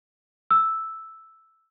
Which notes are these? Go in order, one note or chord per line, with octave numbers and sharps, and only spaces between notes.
E6